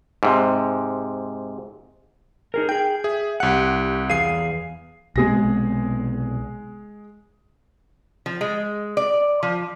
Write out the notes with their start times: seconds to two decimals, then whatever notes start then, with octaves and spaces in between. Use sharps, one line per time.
0.23 G#2 C3
2.54 D#4 G#4 A#4
2.69 G#4 G5 G6
3.04 G#4 E5
3.40 C2 G4 F#5 F#6
4.10 E2 G#4 F5 C7 D#7
5.16 B1 C3 G#3 B3 G#4 A#6
8.26 F3
8.41 G#3
8.97 D5
9.43 F3